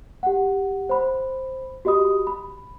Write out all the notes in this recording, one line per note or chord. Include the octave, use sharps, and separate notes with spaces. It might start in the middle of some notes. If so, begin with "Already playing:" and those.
G4 F#5
C5 B5
F#4 G4 D#5 B5 D#6
B5